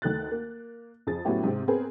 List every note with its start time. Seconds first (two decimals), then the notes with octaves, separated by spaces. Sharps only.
0.02 D2 D#3 A3 F#6 A6
0.32 A#3
1.07 F2 G#4 A6
1.25 A2 F#3 B3 C#4 E4 G4
1.44 G#2 C3 C4
1.68 B3 C4 G#4 A#4 B4